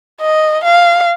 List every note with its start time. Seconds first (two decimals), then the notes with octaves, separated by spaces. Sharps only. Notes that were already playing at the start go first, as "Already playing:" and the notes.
0.21 D#5
0.64 F5